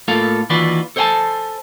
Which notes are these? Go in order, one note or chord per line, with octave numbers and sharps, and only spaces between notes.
A2 A#3 F4 A4 F5
D#2 E3 F4 F#4 B4 D5
A4 C5 C#5 F#5 G#5 A5